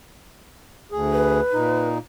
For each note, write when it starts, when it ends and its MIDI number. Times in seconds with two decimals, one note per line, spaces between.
0.92 1.40 38
0.92 1.40 68
1.12 1.89 71
1.53 1.98 46
1.53 1.98 63